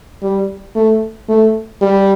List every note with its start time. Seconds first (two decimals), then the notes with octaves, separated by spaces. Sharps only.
0.22 G3
0.75 A3
1.28 A3
1.81 G3